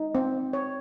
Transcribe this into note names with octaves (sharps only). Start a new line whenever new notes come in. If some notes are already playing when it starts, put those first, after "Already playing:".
Already playing: D#4
C4
C#5